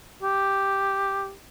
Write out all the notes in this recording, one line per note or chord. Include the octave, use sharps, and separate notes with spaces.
G4